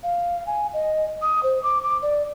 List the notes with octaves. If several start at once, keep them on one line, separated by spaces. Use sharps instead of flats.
F5
G#5
D#5
D#6
C5
D6
D6
D5